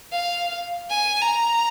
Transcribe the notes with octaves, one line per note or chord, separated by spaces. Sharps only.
F5
G#5
A#5